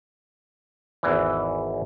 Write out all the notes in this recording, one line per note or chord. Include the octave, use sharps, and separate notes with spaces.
G#1 E2 E3